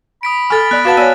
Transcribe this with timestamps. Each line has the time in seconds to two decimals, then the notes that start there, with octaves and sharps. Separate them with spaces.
0.23 B5 D#6 B6 D7
0.50 A4 G#5 F6 A6
0.71 B3 D5 F#6
0.85 F#4 B4 F5 F#5 A5 A6 E7
0.97 B3 C#5 D5 G#5 E6